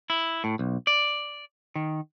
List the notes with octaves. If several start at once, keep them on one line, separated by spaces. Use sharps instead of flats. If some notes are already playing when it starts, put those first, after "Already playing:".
E4
A2
B1
D5
D#3